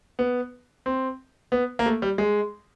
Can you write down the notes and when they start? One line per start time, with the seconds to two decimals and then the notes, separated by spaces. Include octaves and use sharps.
0.19 B3
0.86 C4
1.52 B3
1.79 A#3
1.86 A3
2.02 G3
2.18 G#3